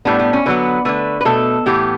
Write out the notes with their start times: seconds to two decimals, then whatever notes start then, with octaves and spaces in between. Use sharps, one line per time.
0.05 A2 G3 B3 D4
0.19 B3
0.33 C#4
0.46 D3 F#3 B3 B4
0.85 D3 A3 B4
1.21 B4
1.25 B2 A3 A4
1.66 A2 E3 B3 G4